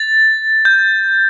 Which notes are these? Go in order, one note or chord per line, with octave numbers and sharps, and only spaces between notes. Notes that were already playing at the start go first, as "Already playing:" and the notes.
Already playing: A6
G6